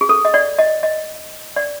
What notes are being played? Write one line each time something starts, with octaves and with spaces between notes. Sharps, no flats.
G#4
A4
D#5
D5
D#5
D#5
D5